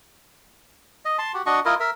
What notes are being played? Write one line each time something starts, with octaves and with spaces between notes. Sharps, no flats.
D#5
A5 C6
F#4 G4
D4 F#4 D#5 C#6
E4 F4 A#4 D#5
A#4 E5